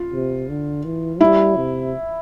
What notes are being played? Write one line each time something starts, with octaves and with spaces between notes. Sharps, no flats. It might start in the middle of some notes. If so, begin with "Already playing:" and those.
Already playing: F4
C3
D3
E3
G3 E4
C3